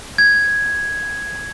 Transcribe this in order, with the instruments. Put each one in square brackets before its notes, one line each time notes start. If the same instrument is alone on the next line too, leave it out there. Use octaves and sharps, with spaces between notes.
[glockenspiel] G#6